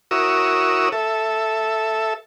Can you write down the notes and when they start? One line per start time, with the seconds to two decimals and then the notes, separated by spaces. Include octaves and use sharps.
0.11 E4 F#4 A#4 C#5 D#6 E6
0.92 A4 E5